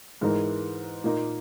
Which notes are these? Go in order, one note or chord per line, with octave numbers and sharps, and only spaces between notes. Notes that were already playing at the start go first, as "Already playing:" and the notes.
G#2 E3 G#3 D#4 A#4
A#2 A#3 D#4